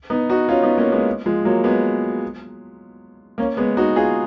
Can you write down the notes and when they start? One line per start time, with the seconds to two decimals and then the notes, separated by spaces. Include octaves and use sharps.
0.10 B3 D#4
0.30 D#4 F#4
0.49 C#4 F4
0.63 B3 D#4
0.78 A#3 C#4
0.92 G#3 B3
1.26 F3 G#3
1.45 F#3 A#3
1.64 G#3 B3
3.38 A#3 C#4
3.57 G#3 B3
3.77 D#4 F#4
3.96 F4 G#4